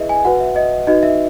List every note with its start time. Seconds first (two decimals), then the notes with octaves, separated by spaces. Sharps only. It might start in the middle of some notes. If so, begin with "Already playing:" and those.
Already playing: E4 G#4 B4 D#5 E5
0.09 G#5
0.25 F#4 B4 F#5
0.40 E5
0.56 D#5
0.87 D#4 F#4 B4 D#5
1.03 E5